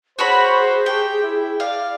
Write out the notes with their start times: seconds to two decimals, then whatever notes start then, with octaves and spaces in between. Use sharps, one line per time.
0.19 F#4 G#4 C5 C#5 B5
0.86 G4 G5
1.23 E4
1.60 D5 F5